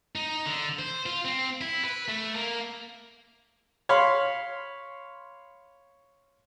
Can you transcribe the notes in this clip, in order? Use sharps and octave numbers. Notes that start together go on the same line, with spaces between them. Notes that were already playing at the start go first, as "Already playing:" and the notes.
D#4
D3
C5
F4
C4
E4
B4
A3
A#3
C#5 F5 B5 C6